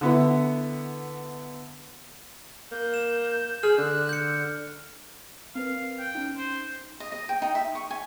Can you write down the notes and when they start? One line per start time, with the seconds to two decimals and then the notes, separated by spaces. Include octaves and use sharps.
0.01 D3 B3 E4
2.72 A#3 G6
2.94 E7
3.63 G#4 F6
3.78 D3 F#6
4.09 G6 C#7
5.55 C4 A#4 B4 F5
5.99 G5
6.15 C#4 D#4
6.37 C5
7.00 D#5
7.12 D#5
7.29 G5
7.42 D#4
7.55 E5
7.75 C#6
7.91 G#5